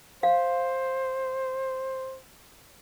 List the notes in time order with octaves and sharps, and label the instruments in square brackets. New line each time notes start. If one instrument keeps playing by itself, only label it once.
[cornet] C5 [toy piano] F5